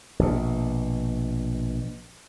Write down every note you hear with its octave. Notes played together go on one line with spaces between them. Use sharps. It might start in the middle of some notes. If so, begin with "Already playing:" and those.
A#1 B2